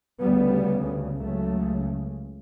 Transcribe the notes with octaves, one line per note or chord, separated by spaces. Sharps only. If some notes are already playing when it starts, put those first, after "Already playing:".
D2 C#3 G3 B3
C#2 C#3 F#3 A3